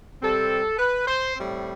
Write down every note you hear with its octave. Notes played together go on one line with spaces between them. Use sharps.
C3 G3 C4 A4
B4
C5
A2 G3 C4